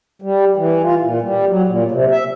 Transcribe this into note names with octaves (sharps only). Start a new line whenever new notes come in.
G3
E3
F4
A#2
G3
F#3
A#2
C3
E5